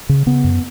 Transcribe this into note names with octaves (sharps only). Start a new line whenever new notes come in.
C#3
C#3 B3
F#2